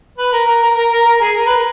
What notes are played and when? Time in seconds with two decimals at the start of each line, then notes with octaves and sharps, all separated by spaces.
0.18 B4
0.32 A#4
0.48 A#4
0.63 A#4
0.77 A#4
0.92 A#4
1.06 A#4
1.21 G#4
1.36 A#4
1.46 B4
1.55 A#4